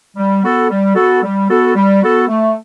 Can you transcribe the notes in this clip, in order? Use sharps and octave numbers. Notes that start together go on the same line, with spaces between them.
G3
B3 F#4 A4
G3
B3 F#4 A4
G3
B3 F#4 A4
G3
B3 F#4 A4
A3